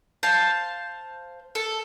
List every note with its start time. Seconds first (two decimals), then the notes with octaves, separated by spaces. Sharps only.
0.23 C5 F5 A5
1.55 A4